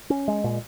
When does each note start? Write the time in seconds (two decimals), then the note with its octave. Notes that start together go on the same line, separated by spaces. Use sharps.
0.10 C#4
0.28 G#3
0.44 A#2